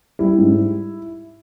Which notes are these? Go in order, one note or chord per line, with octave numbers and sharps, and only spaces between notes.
G3 E4
G#2